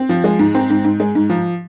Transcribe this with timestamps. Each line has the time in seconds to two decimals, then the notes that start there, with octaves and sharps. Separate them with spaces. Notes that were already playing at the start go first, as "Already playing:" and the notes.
Already playing: C4
0.09 F3
0.24 G#3
0.39 G#2
0.55 C4
0.70 G#2
0.85 G#2
1.00 G#3
1.15 G#2
1.30 F3